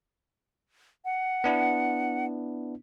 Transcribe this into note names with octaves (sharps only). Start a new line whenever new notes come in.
F#5
B3 D4 E4